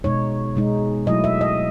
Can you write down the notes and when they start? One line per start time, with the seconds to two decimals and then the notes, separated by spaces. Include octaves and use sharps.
0.04 B2 G#3 D#4 C#5
0.56 B2 G#3 D#4
1.06 B2 F#3 A3 E4 D#5
1.24 E5
1.41 D#5